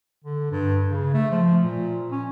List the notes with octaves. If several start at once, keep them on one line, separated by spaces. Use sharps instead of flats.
D3
G2
C#3
A3
F3
A#2
C#4